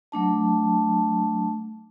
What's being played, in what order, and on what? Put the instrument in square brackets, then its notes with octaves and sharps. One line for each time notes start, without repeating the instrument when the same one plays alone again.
[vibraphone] F#3 A3 D4 A5